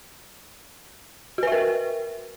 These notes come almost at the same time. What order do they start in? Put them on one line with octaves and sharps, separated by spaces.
F#4 B4 E5 A#4